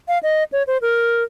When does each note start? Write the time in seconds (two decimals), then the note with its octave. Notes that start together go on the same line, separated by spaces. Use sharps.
0.08 F5
0.23 D#5
0.52 C#5
0.67 C5
0.82 A#4